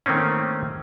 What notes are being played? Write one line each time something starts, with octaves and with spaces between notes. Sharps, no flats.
D#3 A3 A#3 C4 C#4